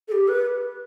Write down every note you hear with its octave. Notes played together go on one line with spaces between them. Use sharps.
A4
G4
B4